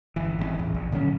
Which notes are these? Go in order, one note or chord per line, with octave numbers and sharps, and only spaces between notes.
G1 E3
G#1 C3 E3
A1 E2
A#1
A#2 D3 F#3 C#4